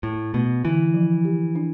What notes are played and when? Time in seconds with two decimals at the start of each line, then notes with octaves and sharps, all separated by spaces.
0.03 A2 A3
0.34 B2 A3
0.64 D3 E3
0.94 F3
1.25 G4
1.55 D4